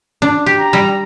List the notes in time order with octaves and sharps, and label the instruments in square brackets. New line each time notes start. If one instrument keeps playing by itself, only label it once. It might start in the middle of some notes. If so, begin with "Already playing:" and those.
[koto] D4
G4
[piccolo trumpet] A#5
[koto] G3